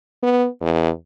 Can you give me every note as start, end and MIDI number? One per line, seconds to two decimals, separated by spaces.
0.23 0.46 59
0.61 0.90 40